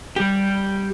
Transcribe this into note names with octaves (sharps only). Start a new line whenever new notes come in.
G3 G4